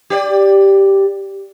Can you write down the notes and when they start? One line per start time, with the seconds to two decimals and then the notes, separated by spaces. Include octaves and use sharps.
0.10 G4 C#5 D5